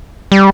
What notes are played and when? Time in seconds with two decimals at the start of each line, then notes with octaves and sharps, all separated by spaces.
0.32 G3